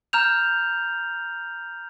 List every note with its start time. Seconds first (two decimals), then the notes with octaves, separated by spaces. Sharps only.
0.13 A#5 F6 G6 F7